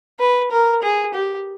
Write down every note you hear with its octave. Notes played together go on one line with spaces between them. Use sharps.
B4
A#4
G#4
G4